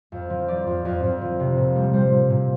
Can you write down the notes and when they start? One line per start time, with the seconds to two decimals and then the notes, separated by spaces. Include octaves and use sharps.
0.12 F2
0.30 F3
0.48 F3 D5
0.67 F2
0.85 F2
1.03 F2
1.21 F3
1.40 C3
1.57 A#2
1.75 G3
1.93 G3 C5
2.12 A#2
2.30 A#2